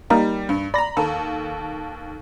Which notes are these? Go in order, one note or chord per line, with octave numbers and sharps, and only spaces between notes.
G3 A#3 D#4 A#4
G2
D5 A#5 B5 A#6
D#2 A4